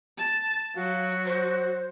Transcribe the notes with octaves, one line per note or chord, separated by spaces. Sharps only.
A5
F#3 F#4 F5
C5